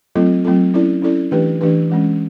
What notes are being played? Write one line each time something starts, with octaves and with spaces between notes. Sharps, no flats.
F#3 A3 C4 F4 A4
F#3 A3 C4 F4 A4
C#4 E4 A4 D5
C#4 E4 A4 D5
E3 A3 D4 G4 B4
E3 A3 D4 G4 B4
E3 G#3 C#4